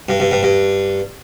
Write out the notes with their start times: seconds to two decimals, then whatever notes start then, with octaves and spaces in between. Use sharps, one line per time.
0.09 G2
0.20 G2
0.31 G2
0.43 G2